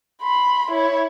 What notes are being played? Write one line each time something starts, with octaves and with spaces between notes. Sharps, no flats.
B5 C6
E4 C#5